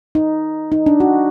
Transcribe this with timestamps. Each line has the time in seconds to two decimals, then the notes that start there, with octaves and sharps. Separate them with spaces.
0.15 D#4
0.72 D#4
0.86 D4
1.00 F#4